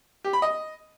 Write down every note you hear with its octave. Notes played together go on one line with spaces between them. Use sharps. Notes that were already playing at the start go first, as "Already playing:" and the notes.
G4
B5
D#5